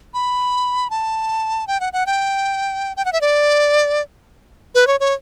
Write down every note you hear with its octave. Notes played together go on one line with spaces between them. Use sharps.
B5
A5
G5
F#5
F#5
G5
G5
F#5
E5
D5
B4
C#5
C#5